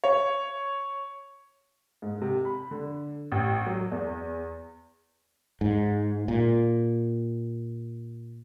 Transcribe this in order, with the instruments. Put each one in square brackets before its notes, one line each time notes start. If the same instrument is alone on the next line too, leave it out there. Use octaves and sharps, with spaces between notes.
[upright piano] C#5
G#2
C3
B5
D3
A1
F#3
E2
[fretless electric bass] G#2
A#2